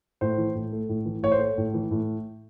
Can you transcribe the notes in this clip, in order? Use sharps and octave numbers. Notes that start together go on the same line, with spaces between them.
A2 C5
E3
A2
A3
A2
E3
A2 C#5
C5
A3 C#5
A2
E3
A2